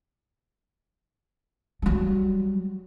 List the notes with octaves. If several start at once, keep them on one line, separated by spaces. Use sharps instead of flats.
F#3 G3